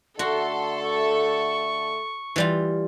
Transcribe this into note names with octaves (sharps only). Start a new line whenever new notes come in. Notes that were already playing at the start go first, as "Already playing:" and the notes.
D3 A3 F#4 A4 C6
C#6
E3 G3 F4